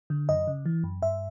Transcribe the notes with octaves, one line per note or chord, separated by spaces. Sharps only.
D3
F#2 D#5
C#3
E3
F#2
G2 E5